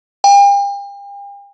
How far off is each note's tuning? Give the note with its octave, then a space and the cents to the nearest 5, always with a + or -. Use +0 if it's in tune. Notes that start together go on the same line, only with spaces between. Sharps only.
G5 +40